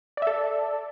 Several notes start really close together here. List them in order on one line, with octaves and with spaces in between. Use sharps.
D5 E5 A4